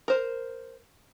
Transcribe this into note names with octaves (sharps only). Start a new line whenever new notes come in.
A#4 C5